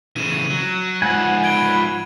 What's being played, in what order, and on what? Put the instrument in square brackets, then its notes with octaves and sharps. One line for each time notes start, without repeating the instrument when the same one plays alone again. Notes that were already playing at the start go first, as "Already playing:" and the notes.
[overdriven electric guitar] C#3 E3 [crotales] D#7 E7
[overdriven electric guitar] F#3
[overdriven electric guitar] G#2 F3 [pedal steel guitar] F#5 G#5 [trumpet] B5
[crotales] G#6 D7 G7